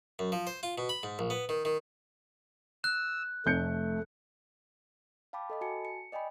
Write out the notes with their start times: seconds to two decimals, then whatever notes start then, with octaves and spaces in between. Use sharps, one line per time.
0.19 F#2
0.32 F3
0.47 C5
0.63 F4
0.78 B2
0.89 B5
1.03 G#2
1.19 A#1
1.30 B3
1.49 D#3
1.65 D#3
2.84 E6 F#6
3.46 F1 A3 G6 C#7
5.33 F5 G5 A5 B5 D6
5.50 A4 D#5 B5
5.61 F#4 G#5 A5 C#7
5.85 C#7
6.12 D5 D#5 G5 G#5 B5